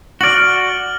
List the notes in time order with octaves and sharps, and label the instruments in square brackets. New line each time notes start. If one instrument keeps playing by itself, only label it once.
[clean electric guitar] F#4 D5 [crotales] F6 F#7